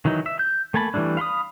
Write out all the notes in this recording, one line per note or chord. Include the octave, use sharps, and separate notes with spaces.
D#3 E3 F#3 D#4
E5
G6
A3 A#3 G#5 A5 B5
E3 F3 G3 A3 D4
F5 B5 C6 D#6